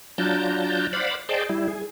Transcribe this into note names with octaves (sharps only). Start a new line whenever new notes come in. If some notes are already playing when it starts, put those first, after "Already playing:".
F#3 D4 F4 A5 A#5 G6
C5 D5 F5 F#5 B5
G#4 C5 D5 D#5 G5 A5
G3 E4
G#4